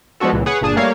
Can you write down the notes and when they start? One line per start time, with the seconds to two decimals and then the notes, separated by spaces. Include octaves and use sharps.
0.20 F3 G#3 B3 D4 F#4 A4
0.33 C#2 A#2 E3
0.46 G#4 B4 C#5 F#5
0.61 G1 A#2 D4 G#4 A5
0.76 G3 A3 A#3 A#4 C#5 F5